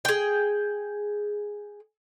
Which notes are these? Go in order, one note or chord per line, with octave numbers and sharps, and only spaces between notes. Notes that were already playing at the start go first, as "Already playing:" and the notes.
G#4 G5